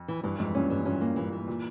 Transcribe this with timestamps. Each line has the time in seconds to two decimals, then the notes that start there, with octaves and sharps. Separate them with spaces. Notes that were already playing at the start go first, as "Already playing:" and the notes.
Already playing: F2
0.08 E3
0.23 G2 E3
0.39 F2 G#2 E3
0.55 G2 A#2 C#4
0.70 G2 E3
0.85 G2 A#2 C#4
1.01 A#3
1.16 G2 A#2 E3
1.32 E3
1.47 A#2